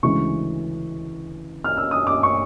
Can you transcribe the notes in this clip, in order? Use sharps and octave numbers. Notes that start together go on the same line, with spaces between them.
D2 C#3 E3 G#3 C#6
F6
E6
D#6
D6
C#6